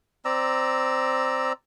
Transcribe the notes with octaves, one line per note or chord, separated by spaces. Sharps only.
C4 D5 A#5 E6